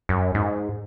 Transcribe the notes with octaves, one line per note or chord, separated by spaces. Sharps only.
F#2
G#2